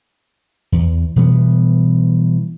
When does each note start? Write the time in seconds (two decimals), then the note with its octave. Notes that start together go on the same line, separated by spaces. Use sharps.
0.72 E2
1.16 B2 E3 G3 B3